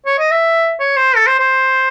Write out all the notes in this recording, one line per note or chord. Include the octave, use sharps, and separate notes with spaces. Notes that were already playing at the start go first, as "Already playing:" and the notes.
C#5
D#5
E5
C#5
C5
A4
C5
C5